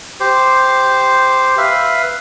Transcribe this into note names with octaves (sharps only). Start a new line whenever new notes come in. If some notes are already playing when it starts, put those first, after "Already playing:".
G4 C5
B4 E5 F5